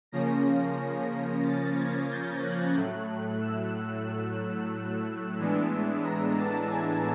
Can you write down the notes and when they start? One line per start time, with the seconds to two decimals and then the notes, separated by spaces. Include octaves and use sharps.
0.12 C#3 F3 A#3 C#4 A#6
1.43 A6
1.76 G#6
2.10 G6
2.42 F#6
2.75 A2 F#3 A3
3.40 E6
5.38 A2 E3 G#3 B3 D4
6.04 A#5
6.37 A5
6.70 G#5